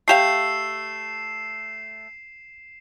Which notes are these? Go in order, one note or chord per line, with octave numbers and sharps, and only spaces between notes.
A3 G4 F5 C7 E7